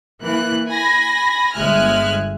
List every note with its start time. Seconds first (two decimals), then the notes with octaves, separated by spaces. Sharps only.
0.22 E3 A#3 F#6
0.68 G#5 B5 A#6
1.55 G1 G#3 E5 G#5 F6 F#6